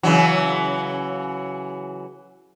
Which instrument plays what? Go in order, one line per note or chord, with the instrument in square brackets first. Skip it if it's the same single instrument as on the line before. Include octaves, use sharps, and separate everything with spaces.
[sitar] C#3 E3 F#3